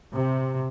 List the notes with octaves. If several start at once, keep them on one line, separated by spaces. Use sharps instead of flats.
C3